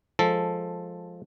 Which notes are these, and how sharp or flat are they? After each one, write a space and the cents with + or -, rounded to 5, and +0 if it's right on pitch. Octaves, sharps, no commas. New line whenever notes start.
F3 +5 G#3 +0 A4 +0